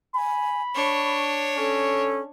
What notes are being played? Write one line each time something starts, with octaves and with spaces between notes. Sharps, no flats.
G#5 B5
D4 C#5 C#6
C#4 A4